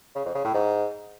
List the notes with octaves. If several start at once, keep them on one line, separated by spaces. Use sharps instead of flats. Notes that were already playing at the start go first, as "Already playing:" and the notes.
C#3
F2
C#3
A2
G#2